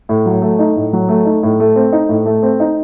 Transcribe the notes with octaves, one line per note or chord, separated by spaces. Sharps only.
A2
F#3
A3
D#4
A2
F#3
A3
D#4
A2
A3
C4
D#4
A2
A3
C4
D#4